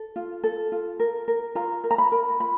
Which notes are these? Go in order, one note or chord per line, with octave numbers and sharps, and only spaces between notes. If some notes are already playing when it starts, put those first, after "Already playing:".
Already playing: A4
F4
A4
F4
A#4
A#4
F4 A#5
A#4
A#5
B5
A#4
F4 B5